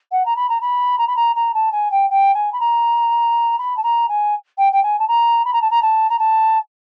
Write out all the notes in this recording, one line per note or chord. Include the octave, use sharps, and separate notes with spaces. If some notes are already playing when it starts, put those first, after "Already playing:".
F#5
A#5
B5
A#5
B5
A#5
B5
A#5
A#5
A5
G#5
G5
G5
G#5
B5
A#5
B5
A5
A#5
G#5
G5
G5
G#5
A5
A#5
B5
A#5
A5
A#5
A5
A#5
A5